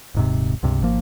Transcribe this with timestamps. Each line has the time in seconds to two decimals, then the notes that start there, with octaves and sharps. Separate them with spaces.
0.15 D#1 G#2 C3
0.63 C#2 G2 C3
0.82 G#1 F3 A#3